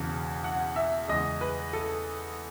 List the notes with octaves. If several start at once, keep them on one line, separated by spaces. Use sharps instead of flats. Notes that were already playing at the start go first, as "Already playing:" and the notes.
Already playing: E1 E2 C#3
F#5
E5
E2 C#3 G#3 D#5
B4
A4